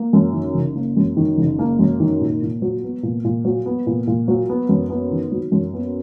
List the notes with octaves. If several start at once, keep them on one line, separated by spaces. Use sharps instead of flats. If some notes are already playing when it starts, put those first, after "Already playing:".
Already playing: A#3
F#2
D#3
F#1
A#3
F#2
D#3
F#1
A#3
F#2
D#3
A#2
A#2
F#3
B3
A#2
A#2
F#3
B3
A#2
A#2
F#3
B3
F#2
B3
D#3
F#3
F#2
B3